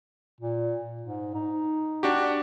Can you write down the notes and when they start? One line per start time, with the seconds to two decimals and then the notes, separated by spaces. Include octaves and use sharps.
0.40 A#2
1.03 G#2
1.34 D#4
2.03 D4 F#4 G4